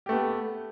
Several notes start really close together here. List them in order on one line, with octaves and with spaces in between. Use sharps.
G4 A3 B3